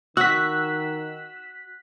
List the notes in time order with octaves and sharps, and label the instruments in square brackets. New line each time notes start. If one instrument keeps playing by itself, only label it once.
[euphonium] D#3 [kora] F#4 [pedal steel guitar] E6 [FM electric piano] F#6 B6